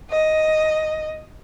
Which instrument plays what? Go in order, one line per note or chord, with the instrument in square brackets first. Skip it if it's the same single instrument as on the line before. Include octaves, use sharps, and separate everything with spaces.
[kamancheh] D#5